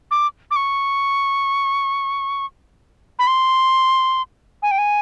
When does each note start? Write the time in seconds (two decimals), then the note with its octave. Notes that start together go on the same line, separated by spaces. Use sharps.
0.11 D6
0.51 D6
0.56 C#6
3.19 B5
3.27 C6
4.62 G#5
4.71 G5
4.78 G#5